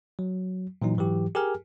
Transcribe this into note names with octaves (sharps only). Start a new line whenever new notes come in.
F#3
A#2 E3 F#3 D#4
G#2 E3 F#3 G4
G4 G#4 A#4 G#5 F6